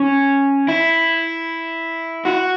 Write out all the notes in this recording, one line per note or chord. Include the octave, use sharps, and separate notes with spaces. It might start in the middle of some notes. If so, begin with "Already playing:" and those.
Already playing: C#4
E4
F#4